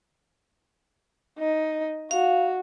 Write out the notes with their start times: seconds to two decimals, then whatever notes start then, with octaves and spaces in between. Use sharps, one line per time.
1.39 D#4
2.11 F#4 F5